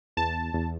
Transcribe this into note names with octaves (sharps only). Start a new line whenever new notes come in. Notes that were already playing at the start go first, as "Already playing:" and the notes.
E2 A5
E2